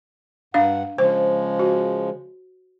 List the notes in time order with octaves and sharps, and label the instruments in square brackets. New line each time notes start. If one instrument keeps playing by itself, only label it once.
[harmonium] G2 F#5 [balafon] D4 F5
[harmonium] C#3 F3 G#3 [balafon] C5
[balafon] F#4